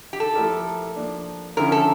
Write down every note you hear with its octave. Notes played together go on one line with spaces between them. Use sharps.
G4
A4
F3 A3 E4 G4 A#4
F3 A#3 D4
D3 F3 C#4 E4 A#4
A4